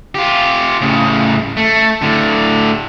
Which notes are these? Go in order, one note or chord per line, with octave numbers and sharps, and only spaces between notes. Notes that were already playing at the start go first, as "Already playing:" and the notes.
F4 G4
A2 C#3
A3
A2 D3